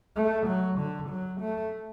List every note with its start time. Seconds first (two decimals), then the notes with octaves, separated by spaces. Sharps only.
0.16 A3
0.47 F#3
0.78 D3
1.09 F#3
1.41 A3